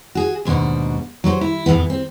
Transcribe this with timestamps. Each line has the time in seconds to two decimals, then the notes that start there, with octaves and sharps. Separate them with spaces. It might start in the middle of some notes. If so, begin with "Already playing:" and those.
0.15 F#4 G#4
0.45 D#2 G#2 B2 D4 F#4
1.24 F#3 F#4 B4 C5
1.41 E4
1.66 E2 A2 E3 B3
1.90 C4